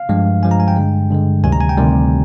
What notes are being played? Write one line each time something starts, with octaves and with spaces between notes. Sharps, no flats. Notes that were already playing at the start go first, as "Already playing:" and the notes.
Already playing: F5
G2 F3 G#3
G2 F3 G#3 G#5
A#5
G#5
G5
G2 D3 G#3
G2 D3 G#3
D2 C3 D#3 G3 G#5
A#5
G#5
G5
D2 C3 D#3 G3